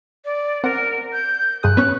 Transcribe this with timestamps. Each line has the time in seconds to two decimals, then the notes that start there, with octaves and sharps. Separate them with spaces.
0.25 D5
0.64 C4 A#4 F#5
1.13 G6
1.63 G2 G#4 D#6 F#6
1.77 B3 C#4 C#6